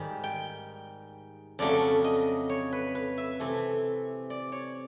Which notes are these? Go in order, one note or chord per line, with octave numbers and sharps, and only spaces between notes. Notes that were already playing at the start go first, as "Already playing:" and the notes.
Already playing: G#2 D#3 G3
G5
F2 C#3 F#3 A3 D5
D#5
C#5
B4
B4
E5
C3 E3 A3
D5
C#5